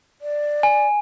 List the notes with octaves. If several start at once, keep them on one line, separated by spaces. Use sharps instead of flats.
D5
G#5